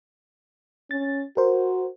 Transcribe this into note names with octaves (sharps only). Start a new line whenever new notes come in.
C#4 A6
F#4 A#4 C5